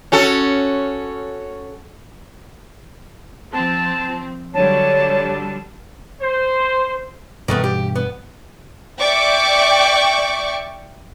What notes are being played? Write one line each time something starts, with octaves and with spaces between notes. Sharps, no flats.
C#4 F#4 A4
F3 C4 A5
D3 F#3 G3 C#5 A5
C5
G2 B2 D#3 E3 A3 B3
G4
B3
D5 E5 G5 C#6 D6